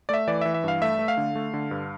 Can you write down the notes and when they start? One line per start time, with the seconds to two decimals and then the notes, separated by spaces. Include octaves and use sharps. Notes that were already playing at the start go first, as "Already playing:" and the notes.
0.09 A3 D5 E5
0.28 E3 D5
0.41 E3 E5
0.54 E5
0.64 G2 F5
0.82 A3 E5
0.99 A3
1.08 F5
1.17 D3
1.36 A3
1.54 D3
1.71 G2